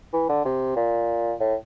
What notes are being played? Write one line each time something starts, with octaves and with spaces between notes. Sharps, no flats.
E3
D3
C3
A#2
A2